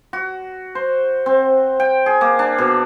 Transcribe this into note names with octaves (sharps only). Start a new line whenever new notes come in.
F#4
C5
C4
G5
G#4
A#3
D4
B2